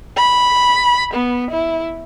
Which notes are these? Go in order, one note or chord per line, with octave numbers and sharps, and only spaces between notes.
B5
B3
E4